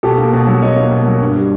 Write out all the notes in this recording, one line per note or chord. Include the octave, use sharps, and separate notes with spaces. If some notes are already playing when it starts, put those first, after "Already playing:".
B2 G4 A4
A#3
B2
F#3
B2 C#5 D#5
A#3
B2
F#3
G2
G3